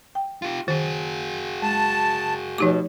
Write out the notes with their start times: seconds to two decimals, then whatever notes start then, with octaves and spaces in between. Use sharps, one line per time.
0.15 G5
0.42 F4 G4
0.68 D#3 F#4 G#4
1.62 G#3 A5
2.58 B2 F3 A3 D#4 G4 C#5 D6